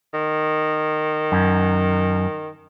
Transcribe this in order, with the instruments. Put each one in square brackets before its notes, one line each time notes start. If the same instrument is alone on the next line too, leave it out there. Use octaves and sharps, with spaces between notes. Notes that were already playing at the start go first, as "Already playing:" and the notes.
[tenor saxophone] D#3
[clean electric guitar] F#2